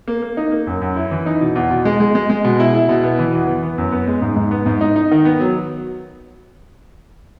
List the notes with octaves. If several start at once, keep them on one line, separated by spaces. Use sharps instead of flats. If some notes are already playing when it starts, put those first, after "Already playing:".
A#3
A#3
D#4
A#3
F#2
F#2
E4
E3
D#4
B2
E2
B2
G#3
G#3
G#3
G#3
B2
E4
E4
B2
B3
E3
E2
E3
B3
F#2
B3
G#3
G#2
G#2
B3
G#2
D#4
D#4
D#3
B3
F#3